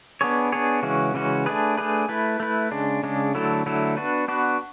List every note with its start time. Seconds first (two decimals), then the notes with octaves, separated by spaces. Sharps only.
0.21 B3 D4 G#4 C#5
0.52 B3 D4 G#4 C#5
0.83 C#3 E3 G#3 C#4 F#4
1.14 C#3 E3 G#3 C#4 F#4
1.46 A3 D4 G#4 B4
1.77 A3 D4 G#4 B4
2.09 A3 E4 B4
2.40 A3 E4 B4
2.71 C#3 G#3 D4
3.03 C#3 G#3 D4
3.35 D3 F#3 A3 E4 A4
3.66 D3 F#3 A3 E4 A4
3.97 B3 D4 F#4 B4
4.28 B3 D4 F#4 B4